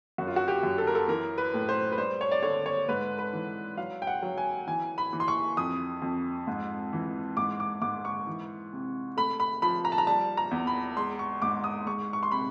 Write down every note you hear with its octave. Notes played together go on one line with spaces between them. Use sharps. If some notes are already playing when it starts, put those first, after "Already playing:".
F#2 F#4
F4
F#4
G4
F#2
A4
A#4
A4
E3 A#4
B4
A2
C5
B4
G3 C5
C#5
D5
D3 C#5
C#5
G#2 B4
B4
E3
F#3 F5
G5
F#5
F#3
G#5
E3 G#5
B5
E3
C6
C#6
F2 D#6
F2
G#2
E3
G#2 D6
D6
G#2 D6
C#6
E3
C3
A3 B5
B5
F3 B5
A#5
A5
A#5
G3 A5
A#5
E2
B5
G#3 C6
C#6
G#2 D6
D#6
G#3 C#6
C#6
C6
C3 B5